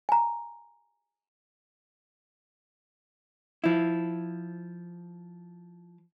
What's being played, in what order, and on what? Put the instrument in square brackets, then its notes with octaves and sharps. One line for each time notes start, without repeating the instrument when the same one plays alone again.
[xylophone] G#5 A#5
[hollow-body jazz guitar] F3 E4